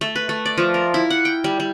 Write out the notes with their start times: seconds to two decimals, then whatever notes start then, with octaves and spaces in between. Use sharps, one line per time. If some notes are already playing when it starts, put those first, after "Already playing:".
0.01 A3
0.16 B4
0.29 A3
0.46 D5
0.58 F3
0.74 A#4
0.94 E4
1.10 F#5
1.25 G5
1.44 G3
1.60 G3